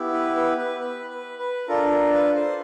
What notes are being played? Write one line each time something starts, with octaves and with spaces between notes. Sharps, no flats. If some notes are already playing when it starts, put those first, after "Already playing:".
Already playing: B3 E4 G4
B4
B4
B4
B4
B4
B4
D4 F4 A4 A#4
A#4
B4
C5